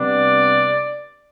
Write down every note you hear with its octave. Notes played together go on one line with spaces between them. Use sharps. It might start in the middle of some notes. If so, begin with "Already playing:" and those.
Already playing: C3 G3 B3 D4 D5